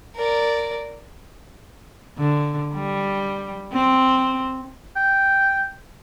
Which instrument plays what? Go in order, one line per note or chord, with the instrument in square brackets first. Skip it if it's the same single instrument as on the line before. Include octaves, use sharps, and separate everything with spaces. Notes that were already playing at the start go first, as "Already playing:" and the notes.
[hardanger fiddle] A#4 D5
[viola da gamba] D3
G3
C4
[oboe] G5